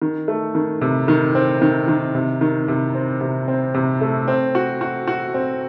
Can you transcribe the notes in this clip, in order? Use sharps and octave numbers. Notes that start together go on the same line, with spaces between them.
D#3
A3
D#3
C3
D#3
C4
D#3
D#3
C3
D#3
C3
C4
C3
C4
C3
A3
C4
F#4
F#4
F#4
C4